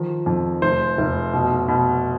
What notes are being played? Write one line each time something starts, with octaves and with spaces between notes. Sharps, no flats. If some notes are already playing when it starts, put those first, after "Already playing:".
Already playing: D#3 F3
F2
F1 C5
F1
B2
B2